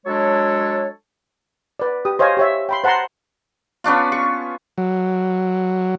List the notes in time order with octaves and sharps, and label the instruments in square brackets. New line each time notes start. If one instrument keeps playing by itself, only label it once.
[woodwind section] F#3 G#3 D4 A4 C#5
[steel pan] B4 D5
G4 D#6
C5 C#5 D#5 F5 G#5
G4 C#5 E5
G5 B5 C6
C5 F#5 A5 A#5 C6
[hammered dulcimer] B3 C#4 D4 F4
C#6
[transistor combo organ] F#3